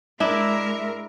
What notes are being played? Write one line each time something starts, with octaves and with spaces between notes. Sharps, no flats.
G#3 D4 E4 A#4 E5